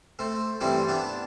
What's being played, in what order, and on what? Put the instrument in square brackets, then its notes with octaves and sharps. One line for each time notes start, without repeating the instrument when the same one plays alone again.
[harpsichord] A3 C4
G2 E3 G3 A3 C4
B3 D4